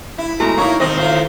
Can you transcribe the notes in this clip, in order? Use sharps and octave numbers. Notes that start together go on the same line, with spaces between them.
E4
B2 G#3 A3 A#5
A#3 D#4 E4 C#5
G#1 C3 D#3 C4 D#5
A2 D#3 F4 C5